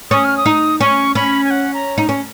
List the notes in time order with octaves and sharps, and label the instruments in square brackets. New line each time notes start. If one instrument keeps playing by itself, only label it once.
[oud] C#4 [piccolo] D#6
[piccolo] F6
D#6
[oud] D#4
[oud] C#4 [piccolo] C#6
[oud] C#4 [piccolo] B5
[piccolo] G#5
F#5
A#5
[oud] D#4
C#4